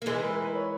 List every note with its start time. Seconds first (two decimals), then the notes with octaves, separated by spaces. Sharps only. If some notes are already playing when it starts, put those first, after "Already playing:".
0.02 A#3
0.06 E3 G#3 A#4
0.18 B4
0.31 B4
0.42 B4
0.55 C#5